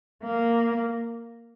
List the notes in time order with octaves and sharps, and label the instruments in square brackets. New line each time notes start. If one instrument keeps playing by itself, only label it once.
[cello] A#3